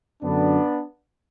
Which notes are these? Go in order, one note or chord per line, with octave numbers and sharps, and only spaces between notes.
F#2 D3 B3 D4